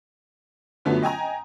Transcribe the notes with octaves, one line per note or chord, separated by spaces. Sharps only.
F#2 D3 F3 F#3 A3 B3
D#5 G5 G#5 A#5